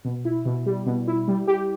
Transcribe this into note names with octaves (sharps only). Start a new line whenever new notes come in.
B2
E4
B2
G3
B2
E4
G3
G4